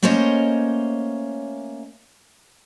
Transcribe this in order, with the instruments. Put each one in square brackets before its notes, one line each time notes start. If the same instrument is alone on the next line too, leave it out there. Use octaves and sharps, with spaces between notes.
[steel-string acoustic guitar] A3 A#3 C#4 C5 C#5 D#5